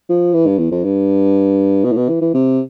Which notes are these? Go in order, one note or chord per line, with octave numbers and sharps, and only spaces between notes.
F3
E3
G2
E2
F2
G2
B2
A2
B2
E3
E3
C3